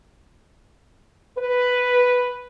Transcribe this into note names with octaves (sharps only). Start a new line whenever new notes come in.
B4